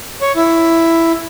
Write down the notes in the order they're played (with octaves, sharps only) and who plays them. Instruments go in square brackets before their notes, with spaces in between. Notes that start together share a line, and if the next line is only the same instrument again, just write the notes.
[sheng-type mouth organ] C#5
E4